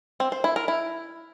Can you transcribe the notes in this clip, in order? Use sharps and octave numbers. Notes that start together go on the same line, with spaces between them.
C4
C5
E4
A#4
E4